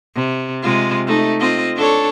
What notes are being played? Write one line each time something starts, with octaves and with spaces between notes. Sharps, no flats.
C3
C3 G#3 F4
A3 D#4
C4 F4 D#5
D4 A4 C#5